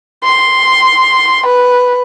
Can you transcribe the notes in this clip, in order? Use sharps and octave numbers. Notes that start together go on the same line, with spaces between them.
C6
B4